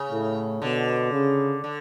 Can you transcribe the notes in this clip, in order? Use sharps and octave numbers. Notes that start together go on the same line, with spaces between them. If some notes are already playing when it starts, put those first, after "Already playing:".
Already playing: C#3
A2
B2 D3
C#3
D3